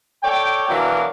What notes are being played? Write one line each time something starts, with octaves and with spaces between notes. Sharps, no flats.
A4 C#5 D5 G5
B2 E3 F#3 D4 A#4 F5